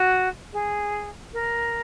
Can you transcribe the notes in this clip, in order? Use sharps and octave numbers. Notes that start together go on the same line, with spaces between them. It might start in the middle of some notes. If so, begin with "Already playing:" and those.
Already playing: F#4
G#4
A#4